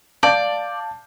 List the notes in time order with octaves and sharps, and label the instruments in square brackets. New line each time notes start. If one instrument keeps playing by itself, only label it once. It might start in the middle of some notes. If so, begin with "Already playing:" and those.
[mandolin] D5 [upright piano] F5 A5 G6